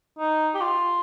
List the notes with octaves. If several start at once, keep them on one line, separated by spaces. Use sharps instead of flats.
D#4
G4
F4